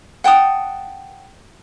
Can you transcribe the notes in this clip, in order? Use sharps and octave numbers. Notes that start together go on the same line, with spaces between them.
F#5 G5 A5 D#6